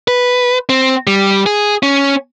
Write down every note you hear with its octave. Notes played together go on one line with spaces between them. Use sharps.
B4
C4
G3
G#4
C#4